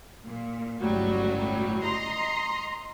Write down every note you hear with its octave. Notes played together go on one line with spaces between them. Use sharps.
A#2
G1 C#2 A2 F#3 G3
D#5 A#5 C6